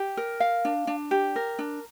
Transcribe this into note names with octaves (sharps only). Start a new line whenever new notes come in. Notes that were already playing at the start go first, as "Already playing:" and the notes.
Already playing: G4
A#4
F5
D4
D4
G4
A#4
D4